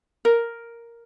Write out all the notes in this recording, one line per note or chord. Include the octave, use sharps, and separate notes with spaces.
A#4